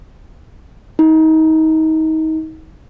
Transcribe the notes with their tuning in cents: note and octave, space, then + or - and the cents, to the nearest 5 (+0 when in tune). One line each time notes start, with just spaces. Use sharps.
D#4 +30